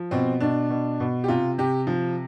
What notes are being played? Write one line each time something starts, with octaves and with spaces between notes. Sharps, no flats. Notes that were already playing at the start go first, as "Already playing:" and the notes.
Already playing: F3
B2 C4
B2 D4
B2
B2
G4
C3 F4
C3 G4
F3